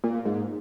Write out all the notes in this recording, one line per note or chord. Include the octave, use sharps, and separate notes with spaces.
A#2
G#2